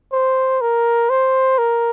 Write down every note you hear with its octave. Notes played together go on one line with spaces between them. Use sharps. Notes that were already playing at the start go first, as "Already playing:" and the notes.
C5
A#4
C5
A#4